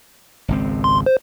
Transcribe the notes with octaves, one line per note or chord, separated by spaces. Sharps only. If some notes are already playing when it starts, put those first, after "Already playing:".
G#1 C#2 C4
C6
C5